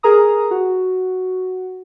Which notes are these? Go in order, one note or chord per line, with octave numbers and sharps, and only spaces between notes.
G#4 A#4 A#5 D#6
F#4